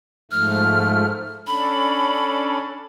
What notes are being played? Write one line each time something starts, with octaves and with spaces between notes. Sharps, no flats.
G#2 F3 A3 F6
C#4 D4 A4 B5